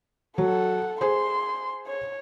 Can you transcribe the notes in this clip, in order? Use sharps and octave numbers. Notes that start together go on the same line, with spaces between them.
F#3 A4 F#5
G#4 C5 C6
C#5